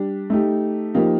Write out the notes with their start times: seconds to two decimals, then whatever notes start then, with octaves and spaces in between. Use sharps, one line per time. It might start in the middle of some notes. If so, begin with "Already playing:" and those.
Already playing: G3 D4 G4
0.30 A3 D#4 G4
0.94 F3 A#3 D#4 G4